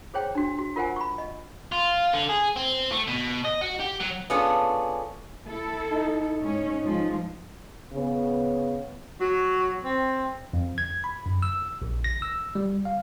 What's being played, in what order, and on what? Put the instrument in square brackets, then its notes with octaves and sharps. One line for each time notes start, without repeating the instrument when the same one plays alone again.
[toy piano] G#4 C5 C#5 G5
D4 F#4
F#4
F4 A#4 C5 F#5 G#5
B5 C#6
D#5
[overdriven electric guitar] F4
D3
G#4
C4
A3
B2
D#5
F#4
G4
F#3
[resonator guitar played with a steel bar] B3 C#4 D4 F4 G#4 A4
[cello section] E4 A4
[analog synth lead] D#4
[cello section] G#2 C#4
F3 G#3
[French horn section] C#3 B3
[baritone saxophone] F#3
C4
[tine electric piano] F2
G#6
B5
F#2
E6
A#1
A#6
E6
G3
F5